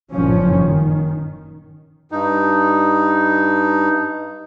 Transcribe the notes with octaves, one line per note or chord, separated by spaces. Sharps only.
F#1 G2 A#2 F3 C#4
D#3
G2 D#4